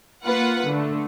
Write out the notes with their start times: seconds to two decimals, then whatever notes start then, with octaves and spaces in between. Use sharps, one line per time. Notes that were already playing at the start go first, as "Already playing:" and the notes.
0.24 A#3 F4 B4 F#5
0.66 D3 A3